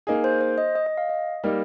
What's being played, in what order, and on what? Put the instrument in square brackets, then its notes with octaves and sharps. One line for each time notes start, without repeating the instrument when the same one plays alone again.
[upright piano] A#3 D#4 G#4
[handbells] C5
C5
D#5
D#5
D#5
F5
D#5
[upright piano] G3 A#3 D#4